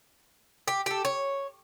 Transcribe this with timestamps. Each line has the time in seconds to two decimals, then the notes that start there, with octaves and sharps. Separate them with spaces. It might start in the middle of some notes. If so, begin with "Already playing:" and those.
0.68 G4
0.86 G4 A4
1.05 C#5